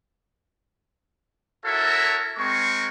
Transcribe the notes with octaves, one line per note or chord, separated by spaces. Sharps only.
E4 F#4 A4 A#4 C#5 E5
G#3 C4 A#4 C#6